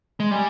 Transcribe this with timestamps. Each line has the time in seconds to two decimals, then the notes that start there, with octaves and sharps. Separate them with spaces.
0.20 G#3
0.30 G3 G#5